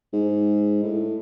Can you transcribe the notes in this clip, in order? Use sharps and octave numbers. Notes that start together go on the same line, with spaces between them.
G#2
A2